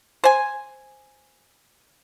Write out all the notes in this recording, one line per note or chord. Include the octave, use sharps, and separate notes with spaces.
C5 G#5